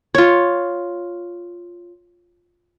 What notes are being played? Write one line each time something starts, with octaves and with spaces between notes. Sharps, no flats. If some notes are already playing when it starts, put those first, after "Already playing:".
F4 C#5